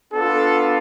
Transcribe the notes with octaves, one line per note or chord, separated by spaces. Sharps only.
B3 D4 F4 A4